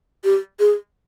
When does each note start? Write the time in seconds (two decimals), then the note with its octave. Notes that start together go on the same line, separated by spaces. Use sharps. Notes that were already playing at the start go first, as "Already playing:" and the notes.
0.24 G4
0.60 G#4